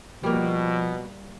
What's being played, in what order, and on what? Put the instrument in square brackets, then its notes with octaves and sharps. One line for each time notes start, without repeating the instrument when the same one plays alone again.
[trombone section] B2 [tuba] F3 [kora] G3 A#3